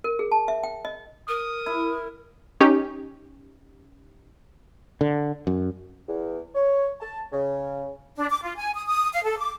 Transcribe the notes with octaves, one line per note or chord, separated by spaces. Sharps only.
A#4
G#4
A5
E5
G5
D#5
A#4 D#6
E4
C#4 D#4 G4
D3
F#2
E2
C#5
A5
C#3
D4
D6
F4
G#5
D#6
D#6
F5
A4
D6